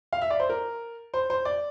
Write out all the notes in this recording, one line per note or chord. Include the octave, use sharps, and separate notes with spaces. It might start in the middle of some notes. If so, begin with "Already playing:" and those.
F5
E5
D5
C5
A#4
C5
C5
D5